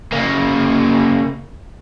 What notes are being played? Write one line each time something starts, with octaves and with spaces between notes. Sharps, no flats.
C#3 A#3